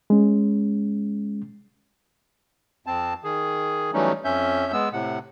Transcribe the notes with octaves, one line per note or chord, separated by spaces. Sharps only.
G#3 C#4
F2 C4 A5
D#3 G#4
E3 F#3 G3 A3 C#4 D#4
F2 C#4 E5 G6
G#3 B3 E6
A2 C3 F#5